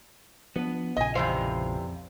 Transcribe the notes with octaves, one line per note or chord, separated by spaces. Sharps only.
F3 B3 D4
A#1 A#2 C#3 D#5 G#5
F2 C3 E3 C5 D5 F5